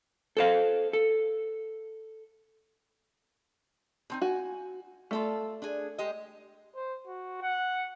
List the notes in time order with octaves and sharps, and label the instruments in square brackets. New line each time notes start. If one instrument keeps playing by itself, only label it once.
[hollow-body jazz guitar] A4 C5 F5
A4
[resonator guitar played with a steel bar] B2 C4 D#4
[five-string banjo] F#4 [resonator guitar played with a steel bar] G#5
[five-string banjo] A3 [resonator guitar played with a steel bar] F4 A4 D5
[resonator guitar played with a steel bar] D4 G#4
G#3 G4 D#5
[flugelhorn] C5
F#4
F#5